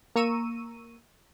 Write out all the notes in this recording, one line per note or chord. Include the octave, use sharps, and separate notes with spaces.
A#3 A#5 C#6 E6 D#7